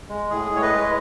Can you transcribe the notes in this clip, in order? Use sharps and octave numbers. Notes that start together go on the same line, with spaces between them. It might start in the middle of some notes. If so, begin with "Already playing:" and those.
G#3
A2 G#4
A2 C#5
B4 D#5
G#3